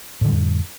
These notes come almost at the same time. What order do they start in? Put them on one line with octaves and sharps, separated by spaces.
A2 D3 G3 F2